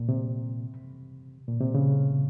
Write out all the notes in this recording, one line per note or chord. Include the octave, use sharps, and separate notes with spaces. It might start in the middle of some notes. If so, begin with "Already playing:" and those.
Already playing: A#2
C3
A#2
C3
C#3